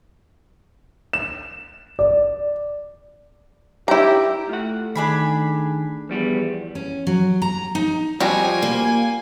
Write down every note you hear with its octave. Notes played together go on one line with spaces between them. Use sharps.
E7
D5
E4 G4 A#5
A3 F4 F#5
D#3 D4 G#4 B5
E2 F3 G3 B3
C#4
F#3
A#5
D#4
F2 F3 G3 F4 F#4 G#5
A#3